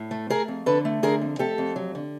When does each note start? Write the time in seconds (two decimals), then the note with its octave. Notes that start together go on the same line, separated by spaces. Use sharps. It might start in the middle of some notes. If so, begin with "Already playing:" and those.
Already playing: A2
0.11 A3
0.30 A3 G#4 A#4
0.48 F2
0.66 D3 A4 B4
0.85 A3
1.03 D3 G#4 A#4
1.21 F2
1.39 A3 G4 A4
1.58 F2
1.76 F#3
1.95 D3